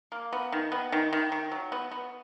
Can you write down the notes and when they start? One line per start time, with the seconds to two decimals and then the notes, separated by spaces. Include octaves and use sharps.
0.12 A#3
0.33 B3
0.52 D#3
0.72 B3
0.92 D#3
1.13 D#3
1.32 D#3
1.52 F#3
1.72 B3
1.92 B3